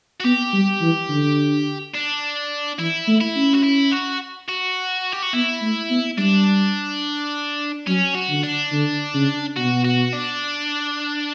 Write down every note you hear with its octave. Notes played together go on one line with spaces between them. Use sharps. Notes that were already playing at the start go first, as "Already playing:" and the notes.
F#4
B3 G4
G3
E3
D3
D4
E3 E4
A3
E4
C#4
F#4
E4
F#4
F#4
G4
F#4
B3 E4
A3
B3
G3 D4
F#3 C#4
F#4
D3
D4
D3
C#3
B2 F#4
F#4
D4